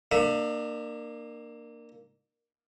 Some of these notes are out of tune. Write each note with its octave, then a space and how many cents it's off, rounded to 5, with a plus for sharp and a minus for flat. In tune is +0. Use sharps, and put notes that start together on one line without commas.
A#3 +0 D4 +35 E5 +0